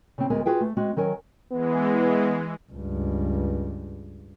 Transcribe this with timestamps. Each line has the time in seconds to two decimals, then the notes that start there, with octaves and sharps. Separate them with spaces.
0.18 C#3 C4
0.30 D2 G#3 B3 G#4 A#4 G#5
0.46 F4 F#4 G#4 B4 G5
0.60 A3
0.77 G#3 C4 F#4
0.96 D#3 F#3 A#4 G#5
1.52 E3 G#3 B3
2.73 C#2 G2